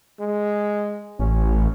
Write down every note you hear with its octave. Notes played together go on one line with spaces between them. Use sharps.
G#3
A1 C#4